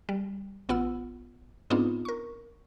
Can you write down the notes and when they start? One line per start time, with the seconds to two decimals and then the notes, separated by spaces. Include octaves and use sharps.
0.09 G3
0.69 A1 B3 F4 F#5 E6
1.70 G#2 B3 C4 D4 D#4 F4
2.05 A#4 C#6